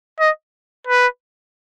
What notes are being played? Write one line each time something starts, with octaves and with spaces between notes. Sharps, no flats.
D#5
B4